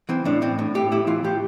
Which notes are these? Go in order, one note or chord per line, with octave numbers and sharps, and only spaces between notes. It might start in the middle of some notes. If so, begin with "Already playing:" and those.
E3 C4
A2 D4
A2 C4
A2
A2 G4
A2 E4
E3 F4
A2 G4